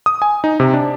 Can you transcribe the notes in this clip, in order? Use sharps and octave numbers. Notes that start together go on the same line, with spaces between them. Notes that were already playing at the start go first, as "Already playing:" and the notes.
D#6
G#5
D#4
C3
D4